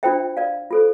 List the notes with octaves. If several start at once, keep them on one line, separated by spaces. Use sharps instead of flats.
D4 F4 C5 E5 G5
D5 F5
F4 A4 C5